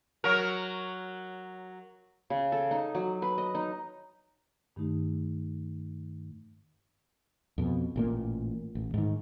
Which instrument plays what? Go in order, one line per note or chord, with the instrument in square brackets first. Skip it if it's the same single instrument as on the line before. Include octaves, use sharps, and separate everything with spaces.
[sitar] F#3 A#4
[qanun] C#3
A4
D#4
F#3
B4
D#5
D#4
[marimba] G2 D#3 A3 D#4 G4
[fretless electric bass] F2 B2
A1 A#2 A#3
A1
G#2 D#3